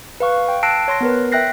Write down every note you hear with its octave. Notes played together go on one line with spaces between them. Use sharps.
B4 F5 C#6
G5
A5 E6 F#6 A#6 C7 D7
C#5 C6 A#6
B3 A#4 B4
E5 G5 F#6 A#6 C7